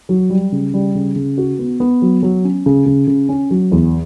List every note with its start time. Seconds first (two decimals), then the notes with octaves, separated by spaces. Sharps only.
0.09 F#3
0.30 G3
0.52 C#3
0.74 G3
0.95 C#3
1.16 C#3
1.38 F#4
1.59 B3
1.80 B3
2.02 F#3
2.23 F#3
2.44 C#4
2.66 C#3
2.86 C#3
3.07 C#3
3.29 C#4
3.50 F#3
3.72 E2